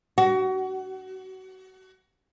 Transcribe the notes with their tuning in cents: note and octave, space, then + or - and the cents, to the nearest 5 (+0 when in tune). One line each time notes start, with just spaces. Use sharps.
F#4 +30